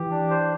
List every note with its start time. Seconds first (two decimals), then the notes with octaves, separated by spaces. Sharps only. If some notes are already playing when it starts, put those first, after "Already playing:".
Already playing: E3 G4
0.11 D4
0.30 C5